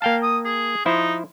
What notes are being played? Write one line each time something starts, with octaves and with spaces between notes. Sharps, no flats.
A#3 F5 G5 A5
D#6
G#4
F3 D#4 E4 C5